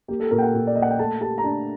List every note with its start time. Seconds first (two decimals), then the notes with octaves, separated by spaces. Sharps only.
0.08 A#3 G4
0.20 A4
0.31 A#2 A#4
0.38 G5
0.42 F#5
0.54 A#2
0.67 D5
0.75 A#3 D#5
0.82 F#5
0.91 G5
0.99 A3 A5
1.21 G4 A5
1.38 A#5
1.44 D4 A5